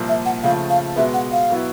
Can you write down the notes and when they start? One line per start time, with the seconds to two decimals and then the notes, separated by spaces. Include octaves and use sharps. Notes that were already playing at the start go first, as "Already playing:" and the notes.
Already playing: C2 A#2 F3 A#3
0.08 E5
0.25 F#5
0.43 C#3 F3 A3 F5
0.70 F5
0.96 B2 G#3 B3 E5
1.14 F#5
1.32 F5
1.50 B2 F#3 B3 E4